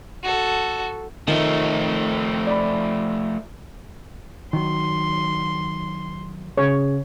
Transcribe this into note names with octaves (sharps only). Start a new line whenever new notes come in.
F#4 A4
D#3 F3 A3
D5 B5
D#3 F#3 C6
C#3 C#5